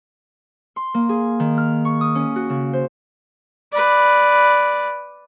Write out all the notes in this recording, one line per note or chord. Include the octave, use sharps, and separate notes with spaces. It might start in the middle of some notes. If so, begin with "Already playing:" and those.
C6
A#3
G#4
D#3
F6
C#6
D#6
C#4
F#4
C#3
C5
B4 D5